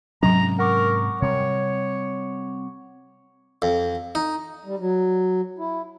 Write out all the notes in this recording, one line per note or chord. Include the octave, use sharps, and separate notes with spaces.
G#2 C3 F#3 C#4 A#5
A#4 F#5 C#6 D6
C3 G3 C#5
F2
D#4
G3
F#3
E4